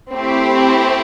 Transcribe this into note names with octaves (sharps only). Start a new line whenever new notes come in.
A3 C4 E4 G4